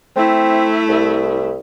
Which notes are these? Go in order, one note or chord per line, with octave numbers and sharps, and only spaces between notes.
A3 C4 E4
C2